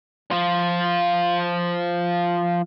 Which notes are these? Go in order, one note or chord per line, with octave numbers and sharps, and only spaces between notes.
F3 F4